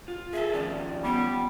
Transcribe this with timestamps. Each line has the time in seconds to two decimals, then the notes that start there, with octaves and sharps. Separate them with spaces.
0.08 F4
0.33 G#4 A4 E5
0.53 D#3 F3 C#4 D5
1.03 G3 B3